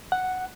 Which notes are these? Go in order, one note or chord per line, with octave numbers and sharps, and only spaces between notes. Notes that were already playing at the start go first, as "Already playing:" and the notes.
F#5